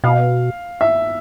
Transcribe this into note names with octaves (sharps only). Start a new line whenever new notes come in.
B2 F5
E5